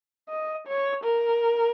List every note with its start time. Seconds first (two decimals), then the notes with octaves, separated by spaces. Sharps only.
0.29 D#5
0.67 C#5
1.04 A#4